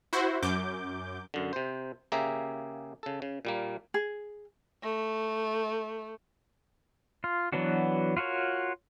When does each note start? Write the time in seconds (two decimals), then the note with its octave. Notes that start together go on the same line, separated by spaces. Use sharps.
0.13 E4 F#4 C5
0.43 F#2 D6 G6
1.34 F#2 D3
1.53 C3 C5
2.12 C#3 A#3 G4 G#4 E5 A#5
3.03 C#3 A4
3.22 C#3
3.45 A#2 G3 A#3
3.94 G#4
4.83 A3
7.24 F4
7.52 E3 F#3 B3 D4 F#4
8.17 F4 F#4 A#4 C#5